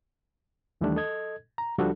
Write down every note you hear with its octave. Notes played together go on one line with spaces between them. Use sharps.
D#2 D#3 E3 G3 A3 D4
A4 D#5 G#6
A#5
C#2 F3 G3 D4 F#4 A4